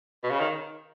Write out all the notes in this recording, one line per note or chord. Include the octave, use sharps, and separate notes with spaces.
B2
C#3
D#3